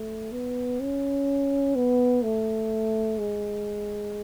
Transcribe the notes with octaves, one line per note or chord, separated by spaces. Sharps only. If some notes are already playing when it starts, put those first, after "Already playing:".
Already playing: A3
B3
C#4
B3
A3
G#3